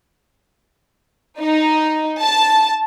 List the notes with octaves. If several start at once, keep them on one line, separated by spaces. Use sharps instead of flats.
D#4
A5